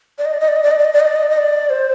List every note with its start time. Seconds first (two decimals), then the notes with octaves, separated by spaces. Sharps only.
0.18 D5
0.25 D#5
0.34 D5
0.40 D#5
0.48 D5
0.56 D#5
0.63 D5
0.71 D#5
0.78 D5
0.85 D#5
0.93 D5
1.00 D#5
1.07 D5
1.16 D#5
1.23 D5
1.30 D#5
1.38 D5
1.70 C5